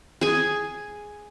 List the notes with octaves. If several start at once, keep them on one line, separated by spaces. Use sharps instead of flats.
G#4 G#5